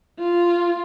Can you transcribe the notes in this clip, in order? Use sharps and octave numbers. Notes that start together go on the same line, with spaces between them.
F4